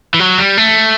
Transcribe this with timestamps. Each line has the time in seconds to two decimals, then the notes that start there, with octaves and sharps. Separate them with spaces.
0.14 E3
0.20 F#3
0.38 G3
0.57 A3